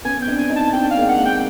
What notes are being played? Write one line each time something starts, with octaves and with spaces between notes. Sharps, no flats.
B3 C#4 G#5
G5
C4 D4
G#5
C#4 D#4
A5
C4 D4 G5
F5
G#3 A#3
F#5
A#3 C4
G5